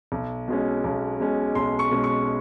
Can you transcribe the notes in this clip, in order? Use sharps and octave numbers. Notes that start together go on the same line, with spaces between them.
B1
B2 G#3 C#4
B1
B2 G#3 C#4
B1 C6
C#6
B2 G#3 C#4
C#6